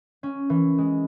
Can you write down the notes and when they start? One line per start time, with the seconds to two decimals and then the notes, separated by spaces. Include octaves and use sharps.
0.23 C#4
0.50 E3
0.78 G#3